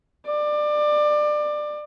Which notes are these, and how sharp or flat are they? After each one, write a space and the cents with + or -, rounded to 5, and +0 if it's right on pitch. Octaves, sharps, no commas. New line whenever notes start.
D5 +25